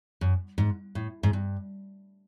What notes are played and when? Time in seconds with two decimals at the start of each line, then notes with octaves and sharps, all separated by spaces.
0.21 F#2
0.58 G#2
0.95 A2
1.23 G#2
1.33 G2